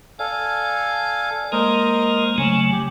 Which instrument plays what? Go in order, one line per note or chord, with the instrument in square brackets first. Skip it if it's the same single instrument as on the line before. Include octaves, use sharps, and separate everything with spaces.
[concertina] A4 F5 G#5 [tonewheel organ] D5
[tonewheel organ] G#3 A#3 [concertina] A#4 C5 D#5
[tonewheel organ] C#3 F#3 A3 [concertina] C#4
[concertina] G4